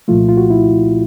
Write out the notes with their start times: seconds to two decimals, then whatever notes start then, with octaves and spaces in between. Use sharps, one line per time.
0.08 C2 A#2 F3 A3 F4
0.29 F4
0.37 F#4
0.50 E4